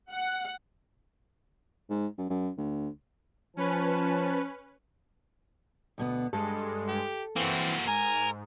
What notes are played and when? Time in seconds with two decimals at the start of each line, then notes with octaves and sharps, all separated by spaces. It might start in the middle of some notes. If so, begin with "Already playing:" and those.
0.12 F#5
1.90 G#2
2.18 F#2
2.30 F#2
2.57 D2
3.57 F3 C#4 B4 C5 A5
5.98 D2 B2 B3
6.33 G2 G#3 A4
6.88 G4
7.36 E3 A#3 C4 F#4
7.88 G#2 A#4 G#5